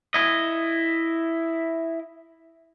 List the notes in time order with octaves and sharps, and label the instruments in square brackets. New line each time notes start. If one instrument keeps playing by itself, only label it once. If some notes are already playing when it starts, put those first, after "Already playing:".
[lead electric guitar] E4 D#5